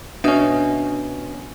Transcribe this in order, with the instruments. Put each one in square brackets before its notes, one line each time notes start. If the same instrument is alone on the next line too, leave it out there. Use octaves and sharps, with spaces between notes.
[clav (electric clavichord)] B2 C#4 [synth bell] D4 E5 D#6